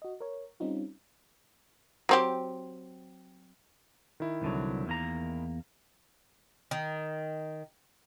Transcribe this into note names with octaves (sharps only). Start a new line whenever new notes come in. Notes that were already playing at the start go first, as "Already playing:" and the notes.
F#4 D#5
A#4 C#5
G3 C4 C#4 D#4 F4
F#3 C4 G4
D#3 E4
C2 D3 F#3
E2 A#3 A#5
D#3